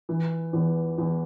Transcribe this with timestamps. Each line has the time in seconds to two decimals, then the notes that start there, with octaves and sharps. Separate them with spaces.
0.09 E3
0.53 E2
0.98 E2